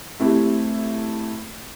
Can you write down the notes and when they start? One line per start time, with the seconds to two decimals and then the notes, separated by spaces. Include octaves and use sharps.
0.20 A3 C4 E4 G4